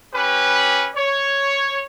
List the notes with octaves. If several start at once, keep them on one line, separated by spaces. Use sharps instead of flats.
C#4 G4 B4
C#5